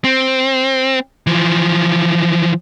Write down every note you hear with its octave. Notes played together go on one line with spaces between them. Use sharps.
C4
E3 F3